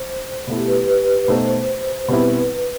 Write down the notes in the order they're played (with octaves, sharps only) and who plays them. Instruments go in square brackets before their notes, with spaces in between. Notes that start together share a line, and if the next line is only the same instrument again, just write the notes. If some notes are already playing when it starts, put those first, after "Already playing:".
Already playing: [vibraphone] C5
[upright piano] B2 A3 E4
[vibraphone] G4
B4
B4
[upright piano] B2 A3 D#4 F#4 [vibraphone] C5
[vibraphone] C5
[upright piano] B2 G3 C4 E4 [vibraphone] B4